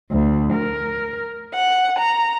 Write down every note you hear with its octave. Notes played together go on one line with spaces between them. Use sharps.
D2
A#4
F#5
A#5